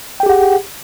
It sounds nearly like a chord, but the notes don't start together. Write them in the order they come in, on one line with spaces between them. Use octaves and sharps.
G5 G#4 G4 F#5